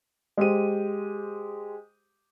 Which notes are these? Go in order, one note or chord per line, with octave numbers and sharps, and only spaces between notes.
G#3 G4 C5 D#7